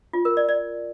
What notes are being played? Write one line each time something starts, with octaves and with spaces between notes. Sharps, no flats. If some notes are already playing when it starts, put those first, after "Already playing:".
F4
A#4
D5
D5